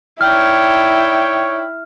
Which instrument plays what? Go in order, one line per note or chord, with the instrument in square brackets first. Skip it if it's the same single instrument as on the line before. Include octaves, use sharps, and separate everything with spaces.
[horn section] D#4 D5 G5 [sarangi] E4 [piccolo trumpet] C#5 [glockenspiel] F6